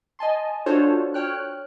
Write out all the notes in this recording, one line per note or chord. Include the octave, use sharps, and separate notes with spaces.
D#5 G#5 A5 C6
D4 F4 F#4 A4 C5 C#5
C#5 G5 F6 F#6